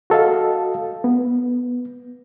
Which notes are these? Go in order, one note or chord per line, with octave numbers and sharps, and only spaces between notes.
F#4 A4 D#5 F5
B3